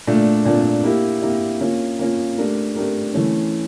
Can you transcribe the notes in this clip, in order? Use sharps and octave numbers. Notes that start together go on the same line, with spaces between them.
A#2 A3 D4
A#2 A3 D4
A#3 E4 G4
A#3 E4 G4
A#3 C#4 F4
A#3 C#4 F4
A3 D4 G4 A#4
A3 D4 G4 A#4
E3 A3 C#4